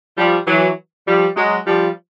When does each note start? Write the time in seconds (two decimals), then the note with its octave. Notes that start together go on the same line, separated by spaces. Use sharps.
0.17 F3 G3
0.47 E3 F#3
1.07 F3 G3
1.36 F#3 G#3
1.67 F3 G3